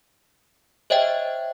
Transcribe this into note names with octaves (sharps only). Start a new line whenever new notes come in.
C5 C#5 D#5 E5 G5